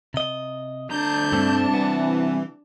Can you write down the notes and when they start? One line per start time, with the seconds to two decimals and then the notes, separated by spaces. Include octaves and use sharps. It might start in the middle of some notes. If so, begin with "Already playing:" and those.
0.14 C3 D#5
0.90 D2 D4 A5 A#5 G6
1.32 C2 G2 A3 C4
1.74 E3 B3